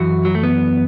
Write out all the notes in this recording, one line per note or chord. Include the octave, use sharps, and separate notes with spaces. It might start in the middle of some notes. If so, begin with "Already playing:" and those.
Already playing: F#2 E3 F#4
F#3
A3
B3